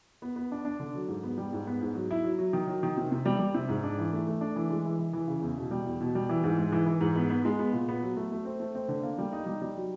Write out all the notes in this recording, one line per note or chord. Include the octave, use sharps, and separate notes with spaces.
B3
B3
D4
D4
D3
F#3
G#2
B3
G3
G#2
B3
G#2
F#3
E4
F#3
F#3
D#3
F#3
D#3
C3
C3
G3
G3
C3
G#2
D4
E3
A3
A3
D4
E3
G#3
E3
E3
E3
C#3
E2
B2
G3
E2
B2
G3
E3
G#2
G#3
E3
E3
G#2
B3
B3
G#3
B3
A#2
B3
F#3
A3
A3
C4
A3
C4
D3
A#3
G3
D#4
G3
G3
F#3